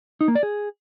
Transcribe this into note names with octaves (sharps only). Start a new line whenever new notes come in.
D#4
A#3
D5
G#4